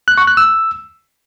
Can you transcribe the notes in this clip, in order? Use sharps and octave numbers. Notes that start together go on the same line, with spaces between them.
F#6
C#6
F#6
E6